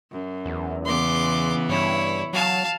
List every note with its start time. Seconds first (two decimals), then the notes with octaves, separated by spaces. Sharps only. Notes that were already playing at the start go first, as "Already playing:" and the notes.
0.11 F#2
0.46 E2
0.85 C#3 E3 B3 C6 D6
1.69 G2 E4 C#5
2.33 F#3 F5 A5